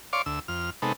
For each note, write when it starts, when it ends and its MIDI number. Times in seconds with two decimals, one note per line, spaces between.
0.13 0.22 73
0.13 0.22 74
0.13 0.22 77
0.13 0.22 84
0.13 0.22 86
0.26 0.40 38
0.26 0.40 88
0.48 0.70 41
0.48 0.70 89
0.82 0.93 48
0.82 0.93 56
0.82 0.93 59
0.82 0.93 63
0.82 0.93 69